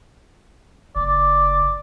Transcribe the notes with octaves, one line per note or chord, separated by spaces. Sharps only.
F#1 D5